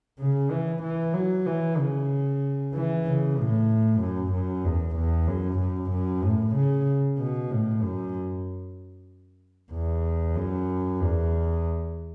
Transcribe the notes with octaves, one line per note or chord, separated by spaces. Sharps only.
C#3
E3
E3
F#3
E3
C#3
E3
C#3
A2
F#2
F#2
E2
E2
F#2
F#2
F#2
A2
C#3
B2
A2
F#2
E2
F#2
E2